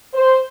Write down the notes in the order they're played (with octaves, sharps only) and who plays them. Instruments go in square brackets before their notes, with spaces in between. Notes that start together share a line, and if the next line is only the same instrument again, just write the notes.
[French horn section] C5